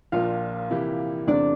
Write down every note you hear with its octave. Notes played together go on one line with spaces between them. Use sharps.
A#1 A#2 F3 A#3 F4 F5
C3 E3 A#3 E4 G4
E2 C3 E3 A3 C4 D4 D5